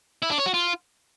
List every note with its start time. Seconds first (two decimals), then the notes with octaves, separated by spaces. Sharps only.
0.22 E4
0.30 D4
0.38 C#5
0.46 F#4
0.54 F4